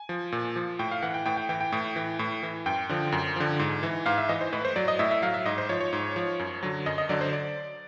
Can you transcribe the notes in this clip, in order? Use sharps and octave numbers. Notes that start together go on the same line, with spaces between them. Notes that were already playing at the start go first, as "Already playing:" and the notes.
Already playing: G#5
F3
A#2
F3
A2 G5
F5
E3 F#5
G5
A2 G5
G5
E3 G5
G5
A2
E3
A2
E3
F#2 G5
D3 F3
F#2
D3 F3
G#2
E3
G#2 F5
E5
E3 D#5
C5
A2 B4
C5
F#3 D5
D#5
A2 E5
E5
F#3 F5
E5
G#2 D#5
C5
F3 C#5
C#5
G#2
F3
F#2
D3 F#3
F#2 D#5
D#5
D3 F#3 D5
C5
D5